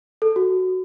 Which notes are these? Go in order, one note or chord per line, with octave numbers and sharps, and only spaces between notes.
A4
F#4